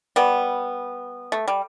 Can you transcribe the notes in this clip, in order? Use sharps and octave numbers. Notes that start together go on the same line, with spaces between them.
G3 B3
A3
G3